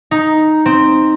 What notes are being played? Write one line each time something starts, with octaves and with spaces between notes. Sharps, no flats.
D#4
C4